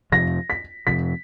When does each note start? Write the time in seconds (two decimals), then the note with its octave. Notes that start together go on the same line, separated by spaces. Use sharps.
0.12 F2 C3 F3 A#6
0.50 B6
0.87 F2 C3 F3 B6